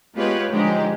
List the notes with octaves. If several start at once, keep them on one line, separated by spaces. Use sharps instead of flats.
G#3 B3 F4 G4 B4 C#5
G#2 D3 F3 G#3 G4